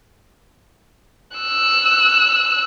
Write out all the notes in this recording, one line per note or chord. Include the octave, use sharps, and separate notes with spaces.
E6 F#6